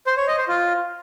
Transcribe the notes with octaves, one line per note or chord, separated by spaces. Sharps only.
C5
C#5
D#5
C5
F4